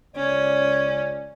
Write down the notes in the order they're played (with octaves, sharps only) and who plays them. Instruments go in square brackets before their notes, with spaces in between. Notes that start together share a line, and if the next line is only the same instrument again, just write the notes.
[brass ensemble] C#2 D5 [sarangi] C#4